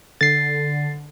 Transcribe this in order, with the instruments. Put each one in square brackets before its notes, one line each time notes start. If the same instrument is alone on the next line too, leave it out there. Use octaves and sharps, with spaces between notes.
[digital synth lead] D3 [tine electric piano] A6 C7